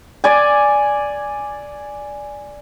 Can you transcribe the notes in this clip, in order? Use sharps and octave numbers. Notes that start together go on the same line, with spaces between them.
D5 G#5